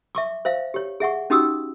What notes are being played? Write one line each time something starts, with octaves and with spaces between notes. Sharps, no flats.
E5 C#6 D6
C5 E5 F5
G4 C#5
G#4 E5 F#5 C#6
C#4 D#4 F#4 G4 D#6 E6